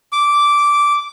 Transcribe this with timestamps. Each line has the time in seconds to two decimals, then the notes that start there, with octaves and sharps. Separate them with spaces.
0.12 D6